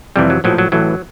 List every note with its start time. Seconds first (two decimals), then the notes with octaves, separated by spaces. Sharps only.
0.16 F2 C3 E3 G3
0.30 F#3
0.44 A#1 A2 F3 F#3
0.58 F#3
0.72 A1 A2 E3 F#3